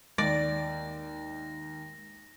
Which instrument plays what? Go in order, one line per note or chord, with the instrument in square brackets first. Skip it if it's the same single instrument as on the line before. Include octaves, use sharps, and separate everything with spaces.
[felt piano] D#2 [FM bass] G#3 [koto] D5 [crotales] A#6